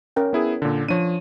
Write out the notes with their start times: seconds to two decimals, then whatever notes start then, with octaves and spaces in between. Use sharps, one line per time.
0.16 C#4 A#4 G5
0.33 B3 E4 G#4
0.62 A#2 D3
0.89 F3 D4 C#5 D#7